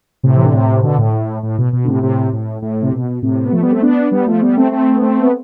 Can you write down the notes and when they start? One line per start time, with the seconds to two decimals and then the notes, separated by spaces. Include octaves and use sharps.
0.23 A2 C3
0.37 E3
0.44 D3
0.53 A2 C3
0.83 B2 D3
0.98 A2
1.43 A2
1.58 B2
1.73 B2
1.84 D3
1.88 A2 C3
2.03 A2 C3
2.33 A2
2.62 A2
2.82 C3
2.92 B2
3.23 A2 C3
3.45 B3
3.52 F3 A3
3.62 G3 B3
3.72 A3 C4
3.82 B3 D4
4.11 G3 B3
4.27 F3 A3
4.42 G3 B3
4.57 A3 C4
4.71 A3 C4
4.96 B3
5.01 A3 C4
5.20 B3